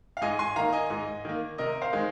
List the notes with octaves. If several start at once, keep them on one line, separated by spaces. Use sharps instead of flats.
F5
G#2 D#5 G#5
G#5 C6
D#3 A#3 F5 A#5
D#5 G#5
G#2
D#3 A#3
C3 A#4 D#5
C5 F5
D#3 G#3